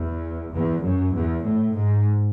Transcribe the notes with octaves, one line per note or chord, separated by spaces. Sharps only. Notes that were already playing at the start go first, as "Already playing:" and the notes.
Already playing: E2
E2
F#2
E2
A2
G#2